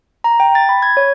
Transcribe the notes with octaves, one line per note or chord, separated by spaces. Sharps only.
A#5
G5
A6
B5
G#6
C#5